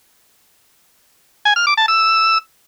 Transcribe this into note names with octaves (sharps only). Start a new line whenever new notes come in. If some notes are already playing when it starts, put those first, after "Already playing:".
G#5
F6
D6
A5
E6